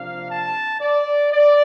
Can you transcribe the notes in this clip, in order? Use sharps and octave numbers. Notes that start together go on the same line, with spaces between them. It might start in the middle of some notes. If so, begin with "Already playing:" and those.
Already playing: C3 F3 A#3 D4 F5
A5
D5
D5